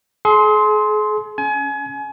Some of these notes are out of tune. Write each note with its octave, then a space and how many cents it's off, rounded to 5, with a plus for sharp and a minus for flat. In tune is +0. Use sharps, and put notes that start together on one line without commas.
G#4 +40 C6 +0
C#4 +0 G#5 +30